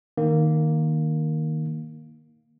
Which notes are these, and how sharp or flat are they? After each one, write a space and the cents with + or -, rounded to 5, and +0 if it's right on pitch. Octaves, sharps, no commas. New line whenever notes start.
D#3 -5 A#3 +0